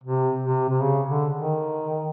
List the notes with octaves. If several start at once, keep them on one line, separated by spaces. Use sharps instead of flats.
C3
C3
C3
C#3
D3
D#3